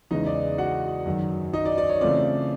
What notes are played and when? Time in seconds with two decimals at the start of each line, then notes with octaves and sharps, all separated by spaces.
0.11 E2 C#3 E3 G#3 D#4 D#5
0.26 D5
0.58 F#4 F#5
1.05 F#2 D#3 F#3
1.53 D#4 D#5
1.65 D5
1.78 D5
1.89 C#5
2.01 C#3 E3 A3 C4 F4 D5